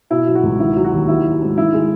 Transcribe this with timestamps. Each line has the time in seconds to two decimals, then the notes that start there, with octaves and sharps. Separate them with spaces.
0.10 B2 E4
0.27 F#3
0.35 F#4
0.43 C#2
0.59 D#3 E4
0.76 F#3
0.84 F#4
0.92 D#2
1.08 D#3 E4
1.25 F#3
1.42 G#2
1.58 D#3 E4
1.73 G#3